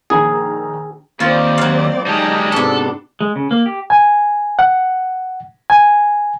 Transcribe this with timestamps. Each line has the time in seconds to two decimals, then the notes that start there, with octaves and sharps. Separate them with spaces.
0.10 A#1 D#3 G#4 A#5
1.20 D#2 C4 F4 C5 D5
1.58 F#3 F5
2.06 G3 G#3 D#4 A5 A#5
2.52 G#2 C3 B3 D4 F#4 A4
3.20 G#3
3.36 C#3
3.51 A#3
3.66 G4
3.90 G#5
4.59 F#5
5.70 G#5